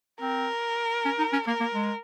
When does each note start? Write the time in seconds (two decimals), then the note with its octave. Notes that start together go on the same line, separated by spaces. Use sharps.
0.20 C4 A#4
1.05 C#4
1.19 D#4
1.33 C#4
1.47 A#3 A#4
1.60 A#3
1.74 G#3